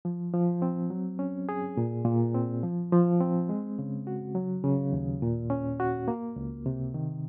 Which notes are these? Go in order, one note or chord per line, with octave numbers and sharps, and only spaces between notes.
F3
F3
C4
F#3
C#4
G#4
A#2
A#2
C4
F3
F3
C4
G#3
C#3
F#4
F#3
C#3
D#2
A#2
C#4
F#4
A#3
C#2
C3
D#3